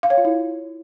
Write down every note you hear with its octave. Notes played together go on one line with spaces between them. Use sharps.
F5
C#5
F4
E4